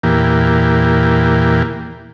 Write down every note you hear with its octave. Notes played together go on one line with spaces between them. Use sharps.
E2 A#2 E3 A#3 G4